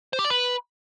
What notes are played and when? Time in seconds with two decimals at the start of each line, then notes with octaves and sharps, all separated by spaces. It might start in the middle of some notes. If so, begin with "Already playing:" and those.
0.13 C5
0.19 G4
0.25 D5
0.30 B4